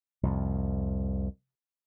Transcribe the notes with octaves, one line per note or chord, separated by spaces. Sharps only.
C2 F2